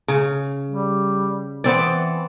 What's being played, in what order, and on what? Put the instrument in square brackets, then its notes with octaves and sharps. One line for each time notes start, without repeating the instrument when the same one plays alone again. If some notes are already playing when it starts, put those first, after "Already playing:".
[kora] C#3
[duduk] G3
[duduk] E3 [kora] B3 C4 D5